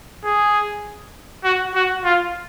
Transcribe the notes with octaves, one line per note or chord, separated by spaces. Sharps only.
G#4
F#4
F#4
F4